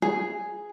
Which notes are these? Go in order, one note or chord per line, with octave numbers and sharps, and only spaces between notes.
G#4